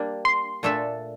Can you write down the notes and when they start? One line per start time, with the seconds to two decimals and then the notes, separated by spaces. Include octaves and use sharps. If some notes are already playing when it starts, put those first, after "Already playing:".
Already playing: G3 A#3 D4
0.25 C6
0.63 A#2 A3 D4 A4 E5